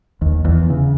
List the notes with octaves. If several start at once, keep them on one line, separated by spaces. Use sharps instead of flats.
D#2
E2
C#3